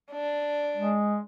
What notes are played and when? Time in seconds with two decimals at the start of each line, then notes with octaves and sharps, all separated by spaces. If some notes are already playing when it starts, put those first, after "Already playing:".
0.12 D4
0.77 G#3